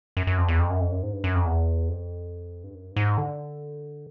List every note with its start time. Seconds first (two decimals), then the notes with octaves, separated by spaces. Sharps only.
0.17 F#2
0.27 F#2
0.38 F2
0.48 E2
0.60 F2
0.70 F#2
0.80 F2
0.91 F#2
1.03 G#2
1.13 G2
1.24 F#2
1.35 F2
1.46 E2
1.89 F2
2.64 G2
2.75 F#2
2.91 G2
2.96 G#2
3.18 D3